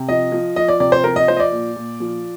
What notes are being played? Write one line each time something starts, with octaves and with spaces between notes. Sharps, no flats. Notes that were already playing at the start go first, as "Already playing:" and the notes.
Already playing: C3
F3 D#5
F3
F3 D#5
D5
C3 D5
C5
F3 A#4
D#5
F3 C5
D#5
D5
A#2
A#2
F3